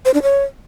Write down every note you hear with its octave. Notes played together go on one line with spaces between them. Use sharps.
C5
D4
C#5